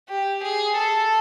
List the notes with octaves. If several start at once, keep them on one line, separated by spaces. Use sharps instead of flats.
G4
G#4
A4